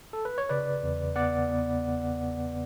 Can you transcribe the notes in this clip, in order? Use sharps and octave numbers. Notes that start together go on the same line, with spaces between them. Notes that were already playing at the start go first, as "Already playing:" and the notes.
A4
B4
C#5
C#3 B4 D5
E2
B3 D5 F#5
B3